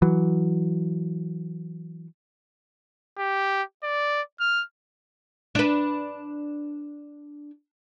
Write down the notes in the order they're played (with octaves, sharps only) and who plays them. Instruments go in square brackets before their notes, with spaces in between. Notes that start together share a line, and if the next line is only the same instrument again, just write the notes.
[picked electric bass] E3 F#3
[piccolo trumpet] G4
D5
F6
[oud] D4 B4